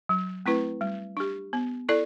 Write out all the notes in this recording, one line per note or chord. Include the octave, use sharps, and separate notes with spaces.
F#3
A3 C4 E4 B4
G3
D4 G4
B3
E4 A4 D5